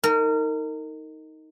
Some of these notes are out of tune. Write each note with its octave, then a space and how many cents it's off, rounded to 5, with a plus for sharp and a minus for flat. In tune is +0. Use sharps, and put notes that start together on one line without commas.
D#4 +15 A#4 -30